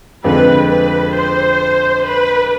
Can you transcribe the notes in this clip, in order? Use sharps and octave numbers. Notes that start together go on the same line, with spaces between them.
F2 D3 G#3 C4 B4
B4
C5
B4